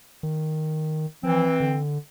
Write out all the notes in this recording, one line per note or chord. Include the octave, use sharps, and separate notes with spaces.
D#3
E3 F3 C4
D3